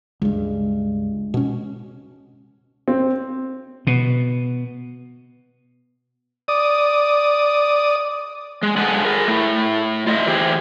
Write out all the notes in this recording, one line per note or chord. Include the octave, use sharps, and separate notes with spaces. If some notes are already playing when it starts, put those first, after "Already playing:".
C#2 G2 G#3
B2 C#4
C4
B2
D5 D#6
G#3
G2 G#3 G#4 A4 F#5 G#5
G#4 A#4
A3 E4
F4 D#5 E5
E3 G4 G#4 C5